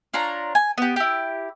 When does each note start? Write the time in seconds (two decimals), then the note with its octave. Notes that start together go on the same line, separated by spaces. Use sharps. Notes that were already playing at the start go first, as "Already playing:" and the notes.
0.14 D4 F4 C#5 A#5
0.55 G#5
0.78 B3 G4
0.96 E4 G4